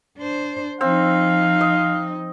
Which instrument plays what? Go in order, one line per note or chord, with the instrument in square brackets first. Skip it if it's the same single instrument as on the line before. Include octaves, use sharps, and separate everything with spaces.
[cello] D4 C5
[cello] F3 D#4 [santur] C4 [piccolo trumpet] F5
[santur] D#5